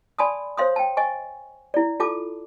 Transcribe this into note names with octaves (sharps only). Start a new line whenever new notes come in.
D5 G#5 A5 B5 C6 D#6
C5 C#5 F5 C6 D#6
G5 A5
D#5 G#5 C#6
E4 D5
F4 A4 A5 D6